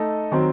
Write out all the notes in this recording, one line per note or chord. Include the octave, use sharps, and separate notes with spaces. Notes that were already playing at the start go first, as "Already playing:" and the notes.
Already playing: A3 D#4 A4 D#5
D#3 F#3 C4